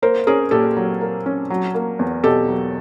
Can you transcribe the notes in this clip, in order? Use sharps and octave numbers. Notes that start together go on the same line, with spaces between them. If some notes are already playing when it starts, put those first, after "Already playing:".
A#3 A#4 C5
C#4 G#4 A#4
A#2 G4 A4
F#3
A#3
C#4
F#3
A#3
E2
B2 G4 A4
F#3